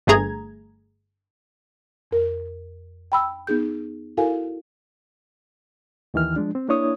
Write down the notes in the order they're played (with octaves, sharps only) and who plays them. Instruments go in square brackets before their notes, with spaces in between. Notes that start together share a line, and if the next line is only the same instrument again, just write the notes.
[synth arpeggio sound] G1 G2 A3 G#4 A#5 G#6
[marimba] F2 A#4
G5 B5 E6
B3 D#4 G#4 G6
E4 F#4 A4 A#4 F5 G#5
[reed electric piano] D#2 D#3 E3 F6
F3 G#3 D4
C4
A#3 D4 E4 C#5 D#6